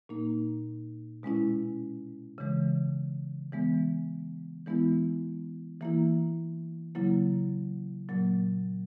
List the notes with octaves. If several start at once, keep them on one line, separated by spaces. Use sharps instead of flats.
A#2 A#3 D#4
B2 G#3 C#4 E4
C#3 E3 G#3
E3 G#3 B3
E3 G#3 B3 E4
E3 A#3 E4
C#3 F#3 A#3 E4
A#2 F#3 A#3